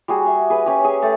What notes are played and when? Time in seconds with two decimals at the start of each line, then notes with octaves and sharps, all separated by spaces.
0.08 G3 F#4 G#4
0.26 E5
0.50 G#4 B4
0.66 C#4 G4
0.84 G#4 G#5
1.02 A3 G4 A5